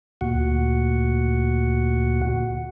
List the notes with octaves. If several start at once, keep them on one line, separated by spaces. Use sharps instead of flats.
D2 A#2 F#4 F#5